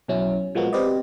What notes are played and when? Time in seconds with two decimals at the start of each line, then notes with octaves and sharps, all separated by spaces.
0.08 B1 B2 F#3 C#4 E4
0.55 A#2 F3 G#3 A#3 B3 F#4
0.73 C4 G4 B4 D5 D#5